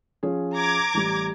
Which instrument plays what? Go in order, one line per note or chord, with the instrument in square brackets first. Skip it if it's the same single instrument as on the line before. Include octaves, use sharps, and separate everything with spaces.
[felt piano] F3 C#4 G#4
[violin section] A#5 D6 G#6
[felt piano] A1 G3